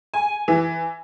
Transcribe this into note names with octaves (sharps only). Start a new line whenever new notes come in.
G#5
E3